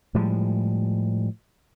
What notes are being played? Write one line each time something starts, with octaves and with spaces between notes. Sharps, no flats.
A2 F3 G3 G#3